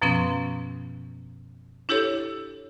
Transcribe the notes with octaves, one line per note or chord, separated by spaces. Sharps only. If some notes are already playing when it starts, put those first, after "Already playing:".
F#2 B2 F3 B3 C#4 C6
D4 E4 G4 A4 C#5